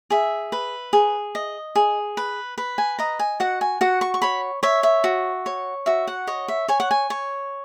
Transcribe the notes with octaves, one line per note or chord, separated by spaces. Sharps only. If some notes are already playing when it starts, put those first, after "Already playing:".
G#4 E5
B4
G#4
D#5
G#4
B4
B4
G#5
D#5 A#5
G#5
F#4 F#5
G#5
F#4 F#5
C#6
C#6
C#5 B5
C#5 E5
E5
F#4
C#5
F#4 E5
F#5
C#5 D#5
E5
C#5 G#5
F#5
G#5
C#5